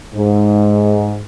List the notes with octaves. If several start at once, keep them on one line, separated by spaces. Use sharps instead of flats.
G#2